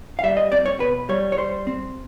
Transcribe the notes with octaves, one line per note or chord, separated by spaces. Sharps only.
F5
G3 E5
D#5
C4 D5
C#5
B2 B4
G3 C#5
C#5
G3 C5
C4